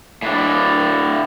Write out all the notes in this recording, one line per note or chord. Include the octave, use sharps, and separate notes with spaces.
A2 D4